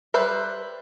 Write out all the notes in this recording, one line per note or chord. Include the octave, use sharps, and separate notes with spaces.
G3 B4 C5 E5